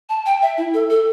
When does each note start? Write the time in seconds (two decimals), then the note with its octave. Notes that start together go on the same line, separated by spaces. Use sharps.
0.09 A5
0.26 G5
0.42 E5
0.58 E4
0.74 A4
0.90 A4